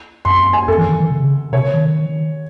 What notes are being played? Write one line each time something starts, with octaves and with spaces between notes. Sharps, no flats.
F#2 C6
G#5
F#2 A4
E3
D#3
D#3
C#3
C3 C#5
D#3